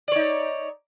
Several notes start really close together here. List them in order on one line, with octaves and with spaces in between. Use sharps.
D5 C#5 D#4